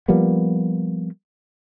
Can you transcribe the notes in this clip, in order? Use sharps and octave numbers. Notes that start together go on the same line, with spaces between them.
F3 G3 A#3 B3